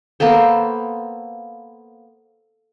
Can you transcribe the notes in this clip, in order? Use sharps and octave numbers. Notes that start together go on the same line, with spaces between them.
A#3 B3 A4 C5